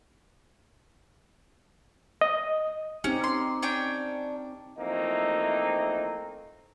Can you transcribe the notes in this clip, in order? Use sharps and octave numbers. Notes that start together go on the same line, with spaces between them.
D#5
C4 C#4 D#4 G4
C6
C#4 D4 G5
E3 F3 A3 A#3 C4 D#4